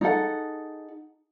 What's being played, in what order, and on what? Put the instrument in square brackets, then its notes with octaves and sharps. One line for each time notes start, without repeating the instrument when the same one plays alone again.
[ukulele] D#4 G#4 A4 F#5